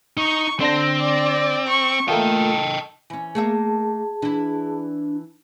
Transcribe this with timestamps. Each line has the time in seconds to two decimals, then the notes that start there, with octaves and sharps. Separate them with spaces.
0.17 D#4 C#6
0.60 D3 C4 D4 C5 A#6
0.98 D5
1.67 C#6
2.08 A3 A#3 F4 A4 D#5 G5
3.10 E3 C#4 G#5
3.35 A3 A#3 G#4 E5 A5
4.22 E3 D4 E4